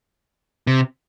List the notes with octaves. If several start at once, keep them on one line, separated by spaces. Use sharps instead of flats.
C3